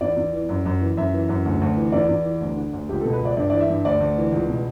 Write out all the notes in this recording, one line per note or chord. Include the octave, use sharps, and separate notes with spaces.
E2 D5
E2
E3
F#2
F#2
E3
F#2 E5
E3
F#2
D2
D2
E3
E2 D5
E2
E3
D2
D3
D2
C#2 G4
B2 A4
B4
C#2 D5
G2 D5
E3 D5
E5
G2
D2 D5
D2
E3
C#2
B2